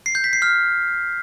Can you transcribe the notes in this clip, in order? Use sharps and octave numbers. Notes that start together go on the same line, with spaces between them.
C7
G6
B6
C7
F6